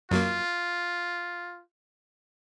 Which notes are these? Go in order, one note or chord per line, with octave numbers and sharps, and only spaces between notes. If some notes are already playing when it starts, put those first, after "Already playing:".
F#2 F#3 A#3 F4